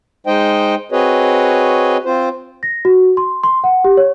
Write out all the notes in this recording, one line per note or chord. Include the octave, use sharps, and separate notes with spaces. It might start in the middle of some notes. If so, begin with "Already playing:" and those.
G#3 D#4 C5 D#5 G5
C4 F#4 G#4 B4 C#5 D#5
C4 F4 C5
A#6
F#4
C6
C6
F#5
G4
C#5